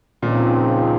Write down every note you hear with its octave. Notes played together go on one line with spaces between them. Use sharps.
C#2 A#2 C#3 F3 C4 D#4